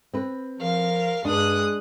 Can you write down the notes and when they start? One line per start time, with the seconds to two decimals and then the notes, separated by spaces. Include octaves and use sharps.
0.13 C4 B4
0.60 F3 A#4 F5
1.25 G2 G#3 D4 D#6 F#6